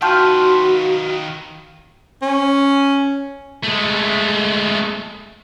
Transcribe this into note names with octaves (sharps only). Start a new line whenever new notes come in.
D#3 F4 F#4 B4 G5 A5 G6
C#4
G#3 A3